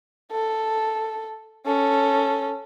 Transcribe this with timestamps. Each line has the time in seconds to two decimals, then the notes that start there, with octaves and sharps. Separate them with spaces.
0.32 A4
1.66 C#4 A4